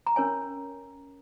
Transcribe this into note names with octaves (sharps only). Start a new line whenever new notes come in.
A#5
C#4 A#4 C#5 G#5